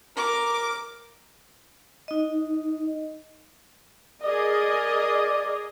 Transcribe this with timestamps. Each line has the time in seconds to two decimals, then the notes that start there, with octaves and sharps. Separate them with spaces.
0.17 A#4 D6
2.08 D#4 D#5
4.23 G#4 A#4 D5 D#5